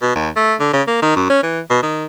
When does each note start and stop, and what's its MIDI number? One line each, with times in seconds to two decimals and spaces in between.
0.02 0.16 47
0.16 0.29 39
0.36 0.54 57
0.60 0.69 50
0.73 0.82 49
0.87 1.01 58
1.02 1.16 51
1.16 1.25 42
1.30 1.41 61
1.43 1.60 52
1.70 1.79 47
1.83 2.06 51